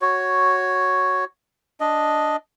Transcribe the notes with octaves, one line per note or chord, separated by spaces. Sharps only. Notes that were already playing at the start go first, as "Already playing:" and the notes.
F#4 C#5
D4 D#5